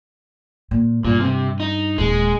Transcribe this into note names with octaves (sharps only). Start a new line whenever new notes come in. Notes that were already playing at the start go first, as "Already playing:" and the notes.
A#2
G2 A#2
C3
D#4
D#1 G#3